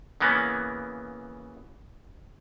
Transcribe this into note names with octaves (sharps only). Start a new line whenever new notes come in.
C#3 E3 A#3 B3 C#4